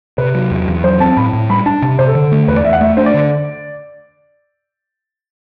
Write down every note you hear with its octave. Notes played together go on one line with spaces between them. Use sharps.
C3 B4
F#3
E2
E2
F#3 C5
C4 A5
A2 B5
A2
G3 B5
D4 A5
C3 A5
C3 C5
A4
D3
A3
E2 B4
D5
E2 E5
F#5
A3 E5
D4 C5
D5
D3